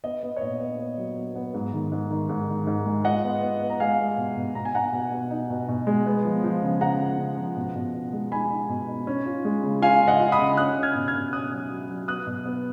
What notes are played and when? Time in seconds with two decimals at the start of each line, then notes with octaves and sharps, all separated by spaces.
0.04 B3 D#5
0.23 B3
0.36 C#5
0.41 A#2 D#5
0.60 B3
0.79 B3
0.98 F#3
1.17 B3
1.36 B3
1.54 G#2
1.73 D#3
1.92 G#2
2.11 D#3
2.29 G#2
2.48 D#3
2.67 G#2
2.86 G#3
3.05 F4 D#5 F#5
3.24 B3
3.42 B3
3.61 B3
3.70 A#5
3.80 G#3 F5 G#5
3.99 B3
4.18 B2
4.37 B2
4.55 B2 A#5
4.65 G#5
4.74 B2 F#5 A#5
4.93 B2
5.12 B2
5.31 D#4
5.50 B2
5.68 B2
5.87 G#3
6.06 B3
6.25 F3
6.44 F3
6.62 C#3
6.81 C#3 F#5 A#5
7.00 C#3
7.19 C#3
7.38 F3
7.56 B2
7.75 B2
7.94 B2
8.13 G#3
8.32 D#4 G#5 B5
8.50 D#4
8.69 B2
8.88 D#4
9.07 C#4
9.26 F4
9.45 G#3
9.63 C#3
9.82 F4 F5 G#5
10.01 C#3
10.07 D#5 F#5
10.20 F4
10.32 B5 D#6
10.39 C#3
10.57 C#4 D#6 F#6
10.76 C#4
10.83 F6 G#6
10.95 B2
11.08 F6 G#6
11.14 B2
11.33 C#4 D#6 F#6
11.52 F#3
11.70 F#3
11.89 F#3
12.08 B3 D#6 F#6
12.27 B2
12.46 B3